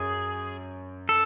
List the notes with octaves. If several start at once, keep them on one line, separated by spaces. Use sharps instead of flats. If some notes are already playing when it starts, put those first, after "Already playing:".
Already playing: F#2 G#4
A4